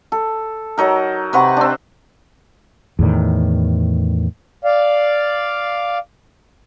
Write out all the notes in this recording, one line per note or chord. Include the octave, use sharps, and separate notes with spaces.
A4
F#3 D#4 A#4
C3 B4 F#5 C#6
C4 D4
E2 A2 D#3
D5 F5